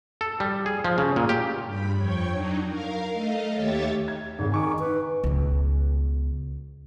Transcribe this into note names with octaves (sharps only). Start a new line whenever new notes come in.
A4
G3
G#4
F3
C#3
A#2
G4
G2 B5
F2 C#5 G5 G#6
F#3 D4 D#4
A#4 F5
A3 D#5 F5
D#2 G4 C#5 E5 A6
G#6
G#1 G#2 C#3
D#3 G#5 C#6 D6
B4
C#2 B2